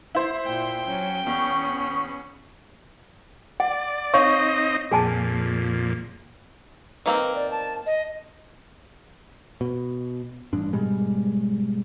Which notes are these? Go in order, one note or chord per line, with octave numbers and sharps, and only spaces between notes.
E4 C5
A#2 G5
F#3 C#4
E2 B3 C#4 C#6 D#6
D5 F#5
C4 D#4 C#5 D#5 F5 C#6
F2 A#2 G#4 G#5 A5
D#3 A#3 C4 B4
D5
A5
D#5
B2
A1 G2 D4
G#2 B2 G3 G#3